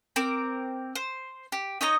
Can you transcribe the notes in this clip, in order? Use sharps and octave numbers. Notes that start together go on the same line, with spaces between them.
C4 A#4 D6
C5
G4
D#4 C#5 D#5 A#5